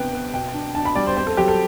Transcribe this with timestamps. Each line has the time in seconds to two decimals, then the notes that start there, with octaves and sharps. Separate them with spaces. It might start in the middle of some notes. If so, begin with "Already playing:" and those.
Already playing: C3 B3 D4 B4 G5
0.13 B3
0.34 B2 G5
0.54 D4
0.75 D4 A5
0.85 B5
0.95 G3 D5
1.07 C5
1.17 C4 C5
1.27 A4
1.37 F#3 G4
1.48 A4